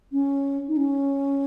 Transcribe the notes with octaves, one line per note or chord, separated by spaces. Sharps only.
C#4
D#4
C#4